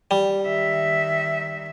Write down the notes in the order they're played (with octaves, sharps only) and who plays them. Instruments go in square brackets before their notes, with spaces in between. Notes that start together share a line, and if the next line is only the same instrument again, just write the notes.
[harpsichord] G3
[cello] D#3 E5